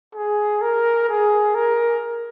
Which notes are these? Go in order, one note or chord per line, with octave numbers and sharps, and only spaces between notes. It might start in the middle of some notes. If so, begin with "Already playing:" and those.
G#4
A#4
G#4
A#4